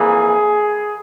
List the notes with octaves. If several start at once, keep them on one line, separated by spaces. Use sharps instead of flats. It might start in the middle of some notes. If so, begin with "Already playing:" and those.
Already playing: F2 E3 A#3 G#4